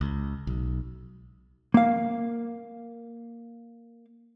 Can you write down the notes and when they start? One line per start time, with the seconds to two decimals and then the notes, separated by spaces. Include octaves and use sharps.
0.01 C#2
0.47 B1
1.74 A#3 F5